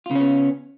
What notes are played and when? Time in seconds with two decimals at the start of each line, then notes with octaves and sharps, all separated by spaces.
0.06 F4
0.11 C#3
0.15 C#4
0.20 B3